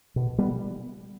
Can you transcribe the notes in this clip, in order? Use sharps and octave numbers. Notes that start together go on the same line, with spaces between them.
B2
G3 B3